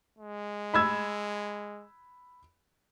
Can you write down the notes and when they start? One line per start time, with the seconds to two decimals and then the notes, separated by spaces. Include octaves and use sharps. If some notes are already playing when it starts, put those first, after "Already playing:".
0.19 G#3
0.74 B5 E6 G#6